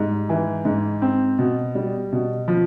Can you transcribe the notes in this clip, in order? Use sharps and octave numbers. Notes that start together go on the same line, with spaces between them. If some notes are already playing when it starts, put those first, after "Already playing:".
Already playing: G#2 G3
E3
G#2
C4
B2
G3
B2
F3